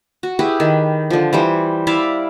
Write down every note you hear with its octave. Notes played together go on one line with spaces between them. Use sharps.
F#4
E4 G4 G#4 B4
D#3
D3 F3
E3 G3 C5
E4 D5 E5 F5